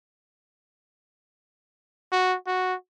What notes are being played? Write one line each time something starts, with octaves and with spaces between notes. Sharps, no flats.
F#4
F#4